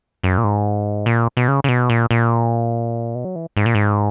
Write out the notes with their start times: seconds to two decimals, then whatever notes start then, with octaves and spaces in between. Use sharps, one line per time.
0.24 F#2
0.38 A#2
0.44 G#2
1.06 A#2
1.37 B2
1.48 C#3
1.64 C#3
1.69 B2
1.90 A#2
2.11 A#2
3.15 B2
3.25 F#3
3.36 E3
3.57 G#2
3.66 A#2
3.75 G#2